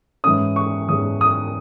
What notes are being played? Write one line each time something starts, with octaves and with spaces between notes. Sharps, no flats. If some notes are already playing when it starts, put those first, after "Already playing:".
G#2 E3 G#3 C#4 D#6
C#6
G#2 E3 G#3 C#4 D#6
D#6